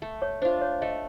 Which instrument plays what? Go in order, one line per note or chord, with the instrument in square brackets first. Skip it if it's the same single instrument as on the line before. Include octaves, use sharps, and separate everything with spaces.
[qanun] A3
[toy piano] C#5
[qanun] D4 F4 [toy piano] C5
[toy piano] C#5
[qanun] A3 [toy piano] D#5